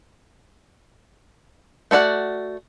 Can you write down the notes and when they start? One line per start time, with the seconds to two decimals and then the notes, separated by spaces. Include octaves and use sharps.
1.91 A3 F#4 D5 F#5